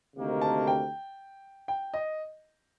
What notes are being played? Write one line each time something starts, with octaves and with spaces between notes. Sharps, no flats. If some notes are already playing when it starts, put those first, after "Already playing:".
D2 C3 D#3 A#3
A5
G5
G5
D#5